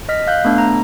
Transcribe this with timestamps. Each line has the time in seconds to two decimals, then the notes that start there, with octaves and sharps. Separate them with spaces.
0.09 D#5 F6 B6
0.27 F5 F#6 G6
0.45 A3 B3 D4
0.58 A#5